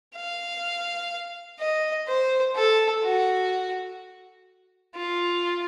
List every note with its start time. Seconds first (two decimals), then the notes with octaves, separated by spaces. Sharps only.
0.16 F5
1.60 D#5
2.07 C5
2.55 A4
3.04 F#4
4.95 F4